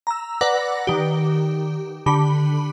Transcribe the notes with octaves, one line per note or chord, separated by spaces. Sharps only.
A#5 E6
B4 D5 F#5 D6 A#6
D#3 G4
D3 G4 B5